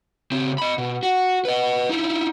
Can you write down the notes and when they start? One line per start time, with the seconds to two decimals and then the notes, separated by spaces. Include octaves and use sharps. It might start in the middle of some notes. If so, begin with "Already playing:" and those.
0.32 C#3 C4
0.58 D#5 B5
0.78 B2
1.03 F#4
1.45 B4 D#5
1.89 D#4 E4